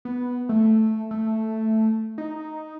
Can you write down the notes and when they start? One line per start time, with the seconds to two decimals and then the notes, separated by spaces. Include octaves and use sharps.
0.05 B3
0.49 A3
1.11 A3
2.18 D#4